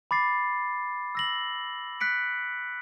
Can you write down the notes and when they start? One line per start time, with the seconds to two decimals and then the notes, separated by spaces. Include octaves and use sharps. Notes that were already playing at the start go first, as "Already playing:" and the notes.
0.11 B5 D6 A6 C7
1.15 E6 A#6 F#7
2.00 F#6 B6 C#7 D7